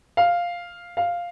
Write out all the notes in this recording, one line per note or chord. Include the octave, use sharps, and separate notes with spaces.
F5
F5